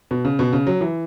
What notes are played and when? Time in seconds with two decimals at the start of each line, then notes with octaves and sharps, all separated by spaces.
0.11 B2
0.25 C#3
0.39 B2
0.53 C#3
0.67 F#3
0.81 E3